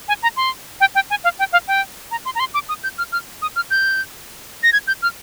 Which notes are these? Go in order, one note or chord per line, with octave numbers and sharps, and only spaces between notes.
G#5
A#5
C6
G5
G5
G#5
F5
G5
F5
G5
A#5
C6
A#5
C6
D6
D#6
G6
F6
F6
D#6
F6
G6
A#6
G#6
G6
F6